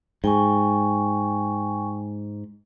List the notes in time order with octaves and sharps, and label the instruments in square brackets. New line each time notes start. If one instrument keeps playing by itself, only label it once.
[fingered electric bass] G#2 [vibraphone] G5 G#5 C#6